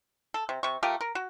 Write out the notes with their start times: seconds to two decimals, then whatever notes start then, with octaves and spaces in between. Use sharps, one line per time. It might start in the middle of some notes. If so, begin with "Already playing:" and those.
0.34 A4
0.49 C3
0.63 C3 C#6
0.83 A3 F4 G4 A#4
1.01 A#4
1.15 F#4